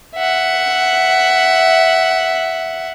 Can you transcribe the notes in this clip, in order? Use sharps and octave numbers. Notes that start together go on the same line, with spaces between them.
E5 F#5